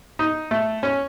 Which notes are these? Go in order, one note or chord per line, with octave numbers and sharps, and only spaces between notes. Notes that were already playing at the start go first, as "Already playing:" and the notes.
D#4
A3
C#4